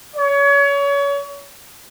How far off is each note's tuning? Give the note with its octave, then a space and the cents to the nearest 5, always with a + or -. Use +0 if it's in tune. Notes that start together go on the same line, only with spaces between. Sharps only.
C#5 +30